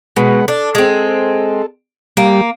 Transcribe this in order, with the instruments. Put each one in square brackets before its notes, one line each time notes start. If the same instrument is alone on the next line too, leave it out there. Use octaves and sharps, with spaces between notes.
[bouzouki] B2 [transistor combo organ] G#3 B4 F#5
[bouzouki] D4 [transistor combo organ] A4
[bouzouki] G#3 C4
[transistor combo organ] G3 [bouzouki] A#3